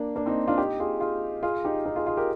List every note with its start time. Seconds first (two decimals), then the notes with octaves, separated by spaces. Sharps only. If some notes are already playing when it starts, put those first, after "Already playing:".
Already playing: A#3 D4
0.15 A#3 D4
0.26 C4 D#4
0.48 D4 F4
0.58 D#4 G4
0.80 F4 G#4
1.00 F4 G#4
1.43 F4 G#4
1.65 D#4 G4
1.86 D#4 G4
1.96 F4 G#4
2.07 F4 G#4
2.17 G4 A#4